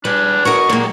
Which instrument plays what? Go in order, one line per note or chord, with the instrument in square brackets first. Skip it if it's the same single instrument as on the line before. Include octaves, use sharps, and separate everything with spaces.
[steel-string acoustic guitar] G3 [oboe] D4 [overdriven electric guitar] G#4 B4
[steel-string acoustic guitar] F#4 A#4 D#5 [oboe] C#6
[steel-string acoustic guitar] A#2 A#3 [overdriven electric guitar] F#3 G#3